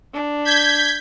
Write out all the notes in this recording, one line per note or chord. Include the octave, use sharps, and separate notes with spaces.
D4
G6 G#6 B6